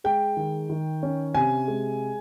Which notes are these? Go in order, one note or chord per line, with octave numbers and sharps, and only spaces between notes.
G#3 G5
D#3
D#3
C#4
C3 G#5
G#3